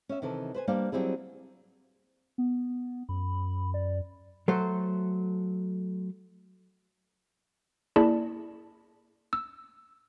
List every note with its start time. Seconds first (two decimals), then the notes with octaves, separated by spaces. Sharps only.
0.09 C#4 E5
0.22 C3 D#3 E3 A4
0.54 B4 C5 G#5
0.68 G3 A#3 B3 D4 C5 F5
0.92 F#3 G3 C4 E4 G#4
2.38 B3
3.09 F#2 B5
3.74 D5
4.48 F#3 A3 A4 C5
7.96 A#3 E4 G#4 D5 A5 B5
9.33 E6